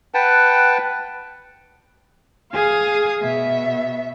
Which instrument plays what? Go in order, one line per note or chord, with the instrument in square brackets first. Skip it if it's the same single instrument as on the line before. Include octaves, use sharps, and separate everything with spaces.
[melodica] B4 F#5 G5 A5
[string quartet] G#4 F5 G#5 D#6
B2 E5